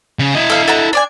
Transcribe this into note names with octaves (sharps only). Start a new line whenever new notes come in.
C#3
E4 D#5
A4 F5
A4 F#5 A#5
D4 D5 G#5